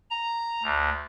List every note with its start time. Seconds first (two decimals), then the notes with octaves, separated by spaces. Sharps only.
0.10 A#5
0.63 D2